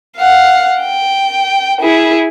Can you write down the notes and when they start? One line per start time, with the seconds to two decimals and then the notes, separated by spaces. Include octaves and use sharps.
0.17 F5 F#5
0.81 G5
1.81 E4 G#4